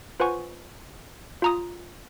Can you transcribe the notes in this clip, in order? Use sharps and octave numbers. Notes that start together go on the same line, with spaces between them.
F4 B4 C5 F#5 G#5 C#6
F4 A#5 D#6